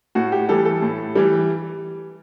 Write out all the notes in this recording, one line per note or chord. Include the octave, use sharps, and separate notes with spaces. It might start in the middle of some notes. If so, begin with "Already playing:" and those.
A2 F#4
G4
E3 G3 A4
A4
A2
E3 G3